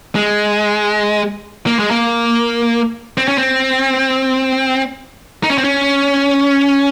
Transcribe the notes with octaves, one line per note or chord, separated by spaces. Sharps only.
G#3
A#3
G#3
A#3
C4
C#4
C4
D#4
C#4
C4
C#4